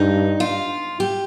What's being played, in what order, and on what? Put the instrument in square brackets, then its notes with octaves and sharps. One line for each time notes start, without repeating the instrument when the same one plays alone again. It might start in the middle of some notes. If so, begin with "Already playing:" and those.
Already playing: [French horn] G2 [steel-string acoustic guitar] D#4
[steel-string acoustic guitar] F4
G4